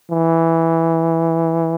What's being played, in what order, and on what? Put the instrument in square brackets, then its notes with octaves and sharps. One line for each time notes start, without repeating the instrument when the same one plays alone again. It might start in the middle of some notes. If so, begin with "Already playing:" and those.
[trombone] E3